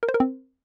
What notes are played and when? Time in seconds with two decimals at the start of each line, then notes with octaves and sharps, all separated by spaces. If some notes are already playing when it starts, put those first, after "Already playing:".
0.03 A#4
0.09 C5
0.14 A#4
0.20 C4